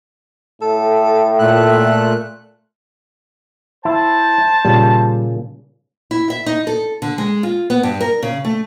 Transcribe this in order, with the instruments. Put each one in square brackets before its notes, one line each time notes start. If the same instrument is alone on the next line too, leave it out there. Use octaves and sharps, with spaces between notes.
[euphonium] A2 [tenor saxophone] A4
[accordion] A#2 A3 F#6 [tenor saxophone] E5
[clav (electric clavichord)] E4 [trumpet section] C5 A5
[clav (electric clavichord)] A#2 C#3 [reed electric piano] G3
[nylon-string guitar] E4
E5
D#4
A4
D3
G#3
F4
B3
G2
A#4
C#3
A3